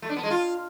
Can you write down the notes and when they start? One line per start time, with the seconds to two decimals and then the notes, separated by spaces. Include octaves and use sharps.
0.02 A3
0.09 D4
0.16 B3
0.23 G#3
0.30 F4